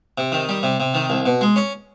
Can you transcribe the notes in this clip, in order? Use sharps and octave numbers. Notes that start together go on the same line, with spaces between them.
C3
D#3
G3
C3
C3
D#3
C2
B2
G#3
C#4